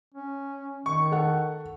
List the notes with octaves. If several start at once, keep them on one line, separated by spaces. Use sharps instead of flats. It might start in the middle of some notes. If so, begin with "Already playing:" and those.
C#4
D#3 C#6
A4 F#5